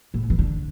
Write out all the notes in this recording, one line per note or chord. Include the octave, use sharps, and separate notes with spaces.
A2
E3
D3